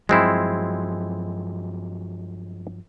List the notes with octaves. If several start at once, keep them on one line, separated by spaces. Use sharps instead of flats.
G2 F3 F#3 G#3 C4 E4